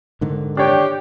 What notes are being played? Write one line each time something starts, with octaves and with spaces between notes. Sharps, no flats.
G#2 D3 D#3
D4 G4 C#5